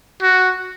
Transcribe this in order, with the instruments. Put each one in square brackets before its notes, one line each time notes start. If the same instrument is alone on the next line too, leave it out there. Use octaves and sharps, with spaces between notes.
[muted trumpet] F#4